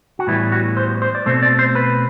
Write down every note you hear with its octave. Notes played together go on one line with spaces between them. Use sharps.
F#4
A2 E3 G3 B3 E4
F#4
C5
C5
D5
B2 A3 C4 C5
D5
C5
B4